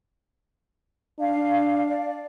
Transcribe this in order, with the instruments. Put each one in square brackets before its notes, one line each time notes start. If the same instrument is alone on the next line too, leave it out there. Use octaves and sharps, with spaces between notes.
[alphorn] D4 [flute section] F5
[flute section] D5